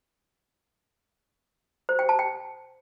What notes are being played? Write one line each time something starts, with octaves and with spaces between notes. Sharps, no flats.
C5
G5
A5
G5